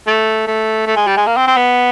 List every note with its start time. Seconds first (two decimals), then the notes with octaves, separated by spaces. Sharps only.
0.07 A3
0.47 A3
0.87 A3
0.96 G#3
1.07 G3
1.17 G#3
1.27 A#3
1.37 C4
1.47 C4
1.57 B3